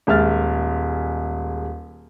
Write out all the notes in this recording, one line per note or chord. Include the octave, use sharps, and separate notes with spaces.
D#1 G#3 E5 F6 A6